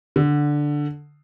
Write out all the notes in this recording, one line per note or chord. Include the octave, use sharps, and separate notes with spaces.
D3